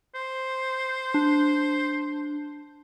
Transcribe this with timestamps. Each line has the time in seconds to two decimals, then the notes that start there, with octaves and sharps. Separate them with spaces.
0.15 C5
1.14 D4